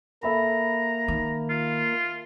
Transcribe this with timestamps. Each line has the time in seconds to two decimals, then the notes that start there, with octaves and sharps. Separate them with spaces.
0.23 A#3 A4 E5 A#5 B5
1.08 D#3
1.49 F4